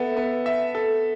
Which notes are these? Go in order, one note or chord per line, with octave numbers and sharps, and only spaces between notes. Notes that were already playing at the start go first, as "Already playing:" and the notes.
Already playing: B3 A4 E5
B3
E5
A4